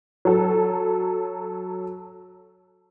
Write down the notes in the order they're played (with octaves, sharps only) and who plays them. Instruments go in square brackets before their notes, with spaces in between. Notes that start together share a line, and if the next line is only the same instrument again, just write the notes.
[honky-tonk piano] F#3 A4